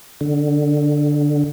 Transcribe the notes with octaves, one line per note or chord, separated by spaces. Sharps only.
D3